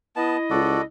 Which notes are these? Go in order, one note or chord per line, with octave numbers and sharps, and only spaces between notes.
B3 E4 D#5 A5
C#2 F#4 A4 D5